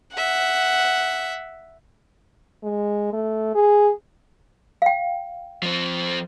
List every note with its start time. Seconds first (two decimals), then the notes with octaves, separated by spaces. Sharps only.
0.17 E5 F#5
2.63 G#3
3.13 A3
3.55 G#4
4.82 F5 G5
5.63 F3 C4